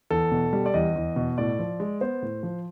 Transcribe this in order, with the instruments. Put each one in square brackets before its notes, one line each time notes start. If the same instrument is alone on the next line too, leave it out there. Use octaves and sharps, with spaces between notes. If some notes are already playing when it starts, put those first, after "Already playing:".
[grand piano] E2 A4
B2
G3
D5
E2 D#5
E2
B2
A2 D5
F3
G#3
B3 C5
A2
F3